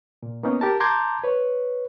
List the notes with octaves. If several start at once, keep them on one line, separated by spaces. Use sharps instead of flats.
A#2
A#3 B3 C#4 D#4
G4 A#4 A5
A5 A#5 C6 D6 G6 G#6
B4 C#5